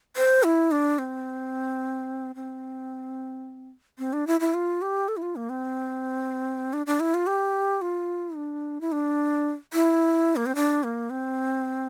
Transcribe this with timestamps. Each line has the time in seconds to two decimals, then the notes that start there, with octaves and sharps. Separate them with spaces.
0.17 C5
0.43 E4
0.71 D4
0.99 C4
2.36 C4
3.98 C4
4.13 D4
4.27 E4
4.40 E4
4.54 F4
4.82 G4
5.08 A4
5.17 E4
5.22 F4
5.36 A#3
5.49 C4
6.73 D4
6.87 D4
7.00 E4
7.14 F4
7.27 G4
7.82 F4
8.36 D4
8.81 E4
8.92 D4
9.73 E4
10.36 A#3
10.46 C4
10.55 D4
10.83 A#3
11.10 C4